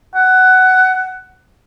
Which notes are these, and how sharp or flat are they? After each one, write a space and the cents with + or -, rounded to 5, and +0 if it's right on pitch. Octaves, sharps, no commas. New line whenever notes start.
F#5 +15